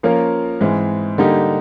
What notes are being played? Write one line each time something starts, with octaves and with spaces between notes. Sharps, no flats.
F3 A#3 C#4 F4 A#4
G#2 E3 G#3 C4
D3 G3 A#3 D#4 G4